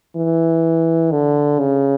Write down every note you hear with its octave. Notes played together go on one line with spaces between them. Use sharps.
E3
D3
C#3